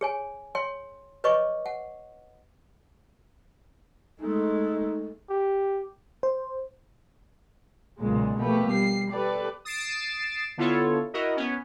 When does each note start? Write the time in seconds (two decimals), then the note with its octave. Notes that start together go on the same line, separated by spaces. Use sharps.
0.01 G#4 C#5 G#5
0.55 C#5 G5 C6
1.24 B4 C#5 D#5 C#6 D6
1.66 F#5
4.22 G#3 A3 D#4
5.29 G4
6.23 C5
8.00 B1 A#2 C#3 G#3
8.41 B2 F3 A3 A#3 G4 B4
8.70 G3 C7
9.12 G4 A4 B4 D5
9.65 D#6 A6 C7 D7 E7
10.57 D3 B3 E4 F4 A4 C#5
11.14 E4 F#4 A#4 D#5
11.37 B3 C#4